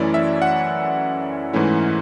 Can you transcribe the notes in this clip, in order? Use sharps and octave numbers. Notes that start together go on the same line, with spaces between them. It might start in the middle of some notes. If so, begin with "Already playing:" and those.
Already playing: F#2 E3 A3 C#4 E4 D5
E5
F#5
G#2 E3 A3 C#4 E4